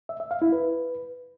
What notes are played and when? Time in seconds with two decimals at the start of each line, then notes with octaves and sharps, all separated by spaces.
0.09 E5
0.20 E5
0.31 F5
0.42 E4
0.52 B4